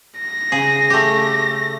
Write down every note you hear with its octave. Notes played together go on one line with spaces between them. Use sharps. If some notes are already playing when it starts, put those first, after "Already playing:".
A#6
C#3 G#4
A3 G4